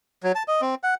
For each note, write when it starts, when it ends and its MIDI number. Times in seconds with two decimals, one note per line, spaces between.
0.23 0.32 54
0.35 0.43 81
0.48 0.61 75
0.61 0.75 60
0.83 0.95 78